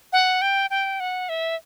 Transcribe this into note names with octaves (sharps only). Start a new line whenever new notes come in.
F#5
G5
G5
F#5
E5